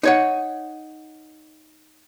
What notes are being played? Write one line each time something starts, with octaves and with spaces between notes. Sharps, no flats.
D#4 C#5 F#5